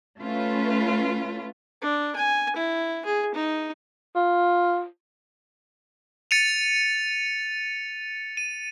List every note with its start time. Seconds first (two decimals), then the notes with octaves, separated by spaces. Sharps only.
0.18 A3 C#4 F4 B4
1.82 D4
2.16 G#5
2.56 E4
3.05 G#4
3.35 D#4
4.15 F4
6.31 A6 C#7 D#7 F7
8.37 D#7